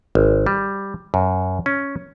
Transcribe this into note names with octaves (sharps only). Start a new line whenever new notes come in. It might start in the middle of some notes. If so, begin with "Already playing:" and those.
G#1
G3
F#2
C#4